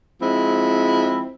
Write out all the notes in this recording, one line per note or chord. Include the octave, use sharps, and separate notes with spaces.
F3 G#3 C4 E4